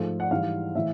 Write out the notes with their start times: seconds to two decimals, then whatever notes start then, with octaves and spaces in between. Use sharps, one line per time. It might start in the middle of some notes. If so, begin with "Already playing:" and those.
Already playing: G#2 F3 A3
0.20 F#5
0.31 G#2 E3 G3 F5
0.75 A2 E3 E5